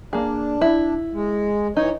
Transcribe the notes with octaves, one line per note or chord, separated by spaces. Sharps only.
A#3 D4 G#4
E4
G#3
E3 D#4 C#5